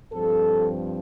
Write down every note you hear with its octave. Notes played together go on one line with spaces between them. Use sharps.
G2 F3 C4 A4